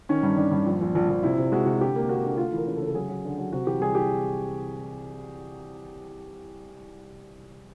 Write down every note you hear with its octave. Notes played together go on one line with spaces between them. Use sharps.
D#3 C#4
G2
G2 D4
G2
A#1
A#1
A#1
A#1
C3 E4
C3
G#3 F#4
C3
D3 G4
A#3
A#3 F#4
D3
A3 F4
E3
A#4
C#3
A4
C#3
A4
F#3 G#4
F#3
D3
F#3
C3 F#4
E3 G4
C2 G#4
G4